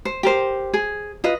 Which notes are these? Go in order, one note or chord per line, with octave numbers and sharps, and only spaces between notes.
C5
G4 A#4 C5
G#4
F4 B4 D#5